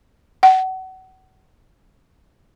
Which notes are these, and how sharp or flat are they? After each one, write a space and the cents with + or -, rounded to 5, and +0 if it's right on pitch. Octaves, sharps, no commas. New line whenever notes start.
F#5 +30